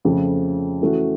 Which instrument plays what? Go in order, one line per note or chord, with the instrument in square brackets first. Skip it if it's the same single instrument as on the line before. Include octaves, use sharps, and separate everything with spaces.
[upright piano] F2 C#3 F3 A3
E3 A3 C#4 F#4